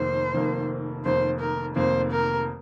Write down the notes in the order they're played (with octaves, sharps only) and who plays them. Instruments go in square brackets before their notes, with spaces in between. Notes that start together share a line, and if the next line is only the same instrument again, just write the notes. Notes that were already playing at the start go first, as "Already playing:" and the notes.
Already playing: [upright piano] F1 F2 D#3 A#3 [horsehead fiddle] C5
[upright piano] F1 F2 D#3 A#3
[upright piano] F1 F2 D#3 A#3 [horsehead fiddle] C5
[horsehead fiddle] A#4
[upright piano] F1 F2 D#3 A#3 [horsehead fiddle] C5
[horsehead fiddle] A#4